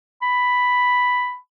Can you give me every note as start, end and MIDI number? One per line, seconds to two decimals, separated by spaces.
0.22 1.37 83